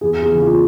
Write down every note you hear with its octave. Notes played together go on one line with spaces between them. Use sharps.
E2 G#4
G#4
C#3 E3
F4